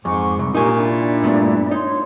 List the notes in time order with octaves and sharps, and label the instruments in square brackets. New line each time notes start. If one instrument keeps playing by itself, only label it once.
[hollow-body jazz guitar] F2 [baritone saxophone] G#2 [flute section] G#5 C#6 D6
[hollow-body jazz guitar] C2
[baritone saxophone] A#2 [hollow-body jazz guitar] D#4 G#5 [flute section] G4 A#4 C#6
[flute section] D4 E4 D5
[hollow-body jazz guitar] G2 A3 B3
[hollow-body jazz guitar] D#4 [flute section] C#5 C6